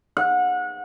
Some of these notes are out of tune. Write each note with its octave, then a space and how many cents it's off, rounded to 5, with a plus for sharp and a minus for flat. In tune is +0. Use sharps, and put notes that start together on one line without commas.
F#5 -30